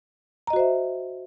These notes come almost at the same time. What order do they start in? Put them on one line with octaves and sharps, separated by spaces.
A#5 D#5 F#4 C5 E5